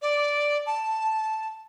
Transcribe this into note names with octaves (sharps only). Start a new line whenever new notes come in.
D5
A5